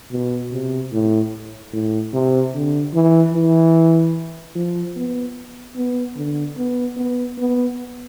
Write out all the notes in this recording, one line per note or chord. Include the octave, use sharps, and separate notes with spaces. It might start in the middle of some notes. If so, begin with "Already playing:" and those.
B2
C3
A2
A2
C3
D3
E3
E3
F3
B3
B3
D3
B3
B3
B3